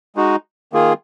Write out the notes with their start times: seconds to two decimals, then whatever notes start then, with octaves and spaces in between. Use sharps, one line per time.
0.16 G#3 D#4 F#4
0.73 D#3 A#3 F4 G#4